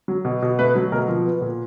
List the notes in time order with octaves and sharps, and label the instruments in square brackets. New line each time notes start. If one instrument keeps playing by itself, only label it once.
[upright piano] F#3
B2
B2
A3 B4
F#3
B2 A#4
F3
B3
A#2